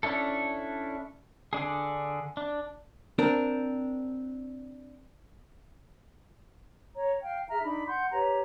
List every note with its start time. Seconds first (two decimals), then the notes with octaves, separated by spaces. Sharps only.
0.03 C#4 D4 E4 A4
1.53 D3 D4 G#4
2.37 D4
3.19 C4 D4 A#4
6.95 C#5 A#5
7.23 F5 G5 F6
7.48 G#4 E5 A#5 F6
7.63 D4 D#4 B5
7.87 F#5 C6 G6
8.12 G4 B4 C#5 A#5